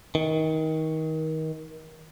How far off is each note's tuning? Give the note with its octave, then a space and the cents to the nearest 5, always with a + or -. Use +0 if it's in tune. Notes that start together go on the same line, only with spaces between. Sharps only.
D#3 +25